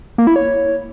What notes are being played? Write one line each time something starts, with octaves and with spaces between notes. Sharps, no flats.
A#3
E4
C#5